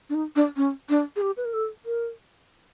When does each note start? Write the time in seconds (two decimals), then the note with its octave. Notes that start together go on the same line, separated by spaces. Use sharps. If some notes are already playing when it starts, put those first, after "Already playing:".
0.10 D4
0.15 D#4
0.36 D4
0.57 C#4
0.89 D4
1.16 G#4
1.22 G4
1.37 B4
1.45 A#4
1.53 A4
1.86 A#4